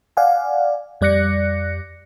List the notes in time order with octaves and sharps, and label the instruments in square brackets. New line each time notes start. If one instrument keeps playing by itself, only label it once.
[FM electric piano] D5 F5 F#5 G#5
F2 G3 D5 F#6 A#6 C#7